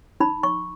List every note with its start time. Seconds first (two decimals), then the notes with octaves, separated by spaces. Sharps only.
0.20 D#4 B5
0.43 C#6